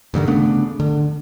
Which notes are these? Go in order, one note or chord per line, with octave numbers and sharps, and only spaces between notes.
D2 G2 D3 D#3
C#3 A3 B3 D4
D3